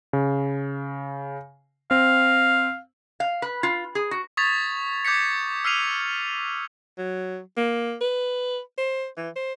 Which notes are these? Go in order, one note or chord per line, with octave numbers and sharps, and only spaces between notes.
C#3
C4 F5
F5
B4
F4
G#4
F#4
C#6 D#6 G#6 A6 B6 F7
D6 G6 G#6 B6 C#7
E6 F6 B6 C7 D#7 F7
F#3
A#3
B4
C5
E3
C5